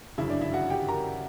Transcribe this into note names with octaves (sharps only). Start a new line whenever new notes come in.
G1 F#2 C#3 E4 E5
D4 D5
E4 E5
F#4 F#5
G4 G5
A#4 A#5